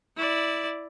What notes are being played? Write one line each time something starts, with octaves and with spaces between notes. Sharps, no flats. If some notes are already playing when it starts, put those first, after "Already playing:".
E4 D5